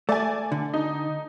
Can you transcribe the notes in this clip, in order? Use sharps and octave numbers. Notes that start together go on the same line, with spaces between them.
A3 D5 G#5
D3
D#4